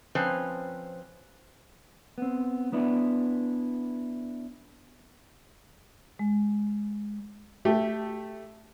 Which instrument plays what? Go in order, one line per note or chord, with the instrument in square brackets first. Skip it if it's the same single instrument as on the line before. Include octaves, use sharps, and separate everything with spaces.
[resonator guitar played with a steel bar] F3 C4 C#4 B4 C5
[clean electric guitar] B3 C4
B3 D4 E4
[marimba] G#3
[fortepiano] A3 G4